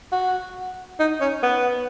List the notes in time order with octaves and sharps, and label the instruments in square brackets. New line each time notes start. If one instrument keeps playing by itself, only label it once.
[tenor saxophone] F#4
D#4
C#4
B3